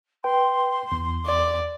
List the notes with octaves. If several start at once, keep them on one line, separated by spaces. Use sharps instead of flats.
B4 G5 C6
E2
D5